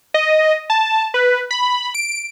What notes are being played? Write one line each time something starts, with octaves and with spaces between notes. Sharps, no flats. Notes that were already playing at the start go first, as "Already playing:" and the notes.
D#5
A5
B4
B5
D7